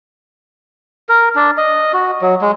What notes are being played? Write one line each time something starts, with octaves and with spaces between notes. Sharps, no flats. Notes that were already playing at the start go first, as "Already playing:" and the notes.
A#4
D4
D#5
F#4
F#3
G#3